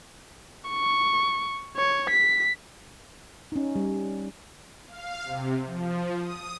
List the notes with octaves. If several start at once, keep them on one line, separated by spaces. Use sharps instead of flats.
C#6
C#5
B6
C#4 D#4
G3
F5
C3
F3
D#6